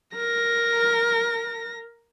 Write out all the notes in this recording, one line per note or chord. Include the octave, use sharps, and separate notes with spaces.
A#4 A#6